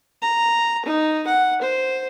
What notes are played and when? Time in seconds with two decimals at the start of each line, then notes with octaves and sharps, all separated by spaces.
0.22 A#5
0.85 D#4
1.27 F#5
1.62 C5